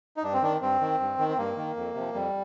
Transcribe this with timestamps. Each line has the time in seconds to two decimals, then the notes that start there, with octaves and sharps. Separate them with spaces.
0.17 D#4
0.23 G2 D4
0.33 C4
0.42 D#3 D4
0.61 G2 C4
0.81 D#3
1.00 G2
1.18 D#3
1.29 C4
1.38 G2 A#3
1.57 D#3
1.76 F2
1.95 C3 F3
2.14 F2 G3